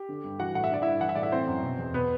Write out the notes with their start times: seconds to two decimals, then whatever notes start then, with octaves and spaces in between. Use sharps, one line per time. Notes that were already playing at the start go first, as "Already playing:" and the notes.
Already playing: G4
0.09 D3
0.24 G2
0.39 E3 F#4 F#5
0.54 A2 F#5
0.64 E5
0.71 D3 D5
0.82 G2 E4 E5
1.01 E3 F#5
1.09 E5
1.15 A2 D5
1.23 E4 E5
1.32 E3 C4 C5
1.47 F#2
1.63 B2
1.78 E2
1.94 B2 B3 B4